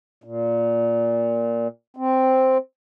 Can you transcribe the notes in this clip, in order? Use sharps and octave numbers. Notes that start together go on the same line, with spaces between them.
A#2
C4